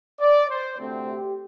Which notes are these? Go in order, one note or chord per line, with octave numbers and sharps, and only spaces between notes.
D5
C5
D2 C3 A3 C4
G4